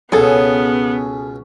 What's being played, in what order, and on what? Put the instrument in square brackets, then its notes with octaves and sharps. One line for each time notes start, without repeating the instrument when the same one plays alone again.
[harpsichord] C#2 B2 [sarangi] B3 [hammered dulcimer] C#4 [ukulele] G#4 A4